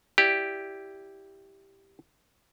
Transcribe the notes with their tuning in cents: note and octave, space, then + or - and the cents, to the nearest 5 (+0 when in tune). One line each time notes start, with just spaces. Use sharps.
E4 -5 G4 +0 D5 +0